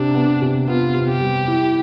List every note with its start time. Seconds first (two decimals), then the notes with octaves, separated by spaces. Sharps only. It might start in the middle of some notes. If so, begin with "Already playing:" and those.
Already playing: C3 D4
0.15 B3
0.42 C3
0.68 B3 F4
0.95 C3
1.08 G4
1.21 G3
1.48 E4